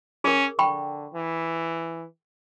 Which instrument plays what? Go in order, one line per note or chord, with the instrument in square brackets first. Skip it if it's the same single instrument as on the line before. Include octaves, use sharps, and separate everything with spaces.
[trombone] C#4 [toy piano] G#4 A#4
[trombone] D3 [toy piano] G5 B5 C#6
[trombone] E3